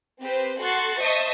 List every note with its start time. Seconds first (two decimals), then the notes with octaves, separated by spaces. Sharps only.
0.20 C4 G4 B4 C5
0.59 F#4 A4 C6 C#6 F#6 A6
1.00 C5 D#5 E5 A5 C#6 D#6